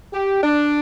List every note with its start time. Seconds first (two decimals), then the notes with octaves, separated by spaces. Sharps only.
0.13 G4
0.43 D4